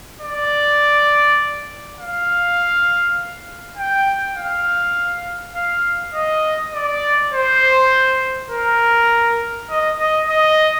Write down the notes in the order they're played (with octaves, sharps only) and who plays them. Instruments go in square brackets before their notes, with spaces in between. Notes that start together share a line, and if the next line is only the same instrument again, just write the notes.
[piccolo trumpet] D5
F5
G5
F5
F5
D#5
D5
C5
A#4
D#5
D#5
D#5